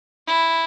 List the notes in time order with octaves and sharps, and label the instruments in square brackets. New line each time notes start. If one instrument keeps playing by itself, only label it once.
[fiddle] E4